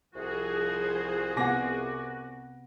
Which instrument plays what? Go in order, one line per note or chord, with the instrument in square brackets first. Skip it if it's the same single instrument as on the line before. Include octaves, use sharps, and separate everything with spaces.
[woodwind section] C2 F#4 [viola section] F3 G#4 C5
[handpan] C3 B3 F#5 [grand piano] G#5 D6 A#6